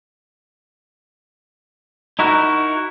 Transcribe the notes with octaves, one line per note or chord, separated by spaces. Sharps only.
D#4 E4 F#4 A#4